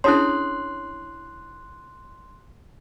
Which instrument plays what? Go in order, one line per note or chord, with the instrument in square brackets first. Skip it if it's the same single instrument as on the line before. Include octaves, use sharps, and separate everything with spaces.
[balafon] C#4 D4 G#4 [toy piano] E4 A4 C#5 [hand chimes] C6 F#6